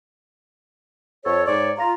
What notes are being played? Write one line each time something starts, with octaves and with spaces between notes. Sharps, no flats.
F2 A4 C#5
G#2 C#5 D5
F4 A#5